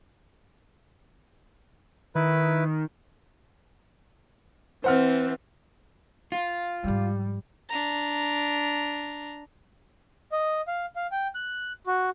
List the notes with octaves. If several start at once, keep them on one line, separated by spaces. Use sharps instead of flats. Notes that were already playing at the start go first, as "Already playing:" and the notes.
D#3 E4 B4
E3 C4 C5 F#5 F6
F4
G#2 F3 G3
D4 A#5
D#5
F5
F5
G5
F#6
F#4